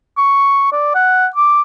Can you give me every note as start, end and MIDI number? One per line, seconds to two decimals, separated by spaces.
0.17 0.68 85
0.72 0.92 74
0.95 1.27 78
1.36 1.61 86